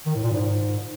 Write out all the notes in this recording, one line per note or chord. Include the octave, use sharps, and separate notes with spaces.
D#3
A2
A#2
G#2